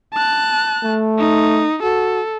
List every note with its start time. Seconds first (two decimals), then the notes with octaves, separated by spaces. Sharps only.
0.14 A5 F#6
0.83 A3
1.18 D#4
1.83 F#4 A4